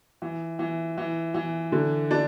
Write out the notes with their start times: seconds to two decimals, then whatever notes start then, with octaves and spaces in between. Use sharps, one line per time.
0.22 E3
0.59 E3
0.98 E3
1.34 E3
1.72 D3
2.11 D4